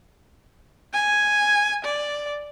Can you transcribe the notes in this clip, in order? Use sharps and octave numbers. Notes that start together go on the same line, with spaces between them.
G#5
D5